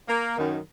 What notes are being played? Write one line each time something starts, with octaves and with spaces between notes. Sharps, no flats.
A#3
F#2 D#3